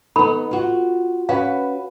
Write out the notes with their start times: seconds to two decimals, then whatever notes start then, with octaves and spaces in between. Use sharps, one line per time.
0.16 B3 D#4 A4 B5
0.51 F4 F#4
1.29 C#4 F#4 B4 F5